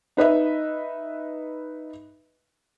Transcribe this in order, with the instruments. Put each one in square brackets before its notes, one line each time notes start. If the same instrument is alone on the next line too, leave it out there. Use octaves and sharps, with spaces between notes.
[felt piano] D#4 B4 D#5 E5